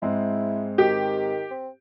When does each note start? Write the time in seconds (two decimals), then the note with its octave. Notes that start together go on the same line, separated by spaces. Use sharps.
0.02 G#2 G#3 C4 E4
0.78 D#3 G4
1.51 C4